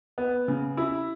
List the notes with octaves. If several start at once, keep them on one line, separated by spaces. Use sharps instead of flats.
B3
C#3
E4